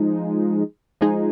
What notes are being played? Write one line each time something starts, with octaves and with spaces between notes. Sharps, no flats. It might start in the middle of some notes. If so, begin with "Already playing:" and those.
Already playing: F3 G#3 D#4
F3 G#3 D#4 G#4